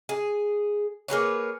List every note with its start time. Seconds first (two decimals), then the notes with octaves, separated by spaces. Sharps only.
0.09 G#4
1.08 A#3 G#4 B4 C#5